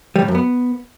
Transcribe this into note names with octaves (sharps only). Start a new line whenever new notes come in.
G3
A2
F#2
B3